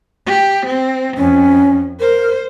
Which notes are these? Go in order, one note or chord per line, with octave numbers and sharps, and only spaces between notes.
G4
C4
F2 C#4
A#4 C5